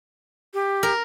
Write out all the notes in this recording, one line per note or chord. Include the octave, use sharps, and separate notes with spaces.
G4
A#4